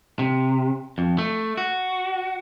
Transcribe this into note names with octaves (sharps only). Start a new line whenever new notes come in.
C3
F2
A3
F#4